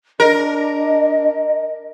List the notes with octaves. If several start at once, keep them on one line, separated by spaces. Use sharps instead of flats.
D4 A#4 D#5